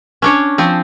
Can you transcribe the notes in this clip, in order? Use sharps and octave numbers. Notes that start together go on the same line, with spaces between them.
C#4 D4 C#5
F3 C4